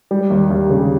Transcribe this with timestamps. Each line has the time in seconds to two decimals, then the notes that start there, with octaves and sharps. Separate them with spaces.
0.11 G3
0.30 D#2
0.50 D#2
0.70 C#3